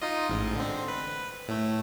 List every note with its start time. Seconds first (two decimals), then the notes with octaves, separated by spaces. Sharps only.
0.02 D#4 F4 D#5
0.29 A1 G#2
0.56 D3 C4
0.88 B4
1.48 A2 A3